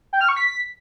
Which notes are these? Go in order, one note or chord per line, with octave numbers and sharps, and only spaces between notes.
G5
F6
C#6
B6